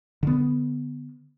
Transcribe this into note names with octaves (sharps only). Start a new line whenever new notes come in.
D3 B3